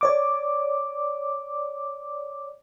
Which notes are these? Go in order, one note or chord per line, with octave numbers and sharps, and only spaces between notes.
C#5 D5 D6